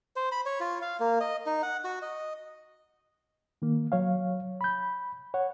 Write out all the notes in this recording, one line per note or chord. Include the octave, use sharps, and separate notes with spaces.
C5
B5
C#5
F4
F5
A#3
D#5
D#4
F#5
F#4
D#5
D#3 A#3
F#3 C#5 F5
B5 G6
C#5 F#5